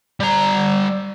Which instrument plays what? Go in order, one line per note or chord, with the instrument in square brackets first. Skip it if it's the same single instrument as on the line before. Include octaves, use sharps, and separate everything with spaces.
[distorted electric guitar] G3 A#5